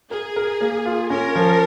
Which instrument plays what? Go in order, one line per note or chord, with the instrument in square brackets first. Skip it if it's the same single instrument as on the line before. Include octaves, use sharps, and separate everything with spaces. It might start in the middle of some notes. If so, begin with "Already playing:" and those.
[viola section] G#4 [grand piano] A#4
[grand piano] A#4
A#3
F4
[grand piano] C#4 [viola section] A#4
[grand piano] F3